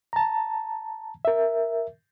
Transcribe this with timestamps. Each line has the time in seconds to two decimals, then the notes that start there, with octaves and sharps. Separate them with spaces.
0.13 A5 A#5
1.25 A#4 E5